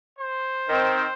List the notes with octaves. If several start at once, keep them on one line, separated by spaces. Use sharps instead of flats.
C5
D#3 C4